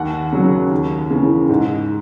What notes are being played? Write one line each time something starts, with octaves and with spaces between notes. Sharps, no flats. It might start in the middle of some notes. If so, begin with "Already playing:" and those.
Already playing: D#2 F#5
C#3 F#3
D#2
C#3 E3
G#2